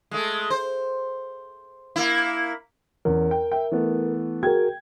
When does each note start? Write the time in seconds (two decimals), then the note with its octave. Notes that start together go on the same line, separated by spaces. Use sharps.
0.11 G#3 A3
0.50 C5
1.96 A#3 E4
3.05 E2 C#4 A#4
3.31 G5
3.52 E5 G5
3.71 E3 A3 B3
4.43 F#4 G#4 A#4 G5 G#6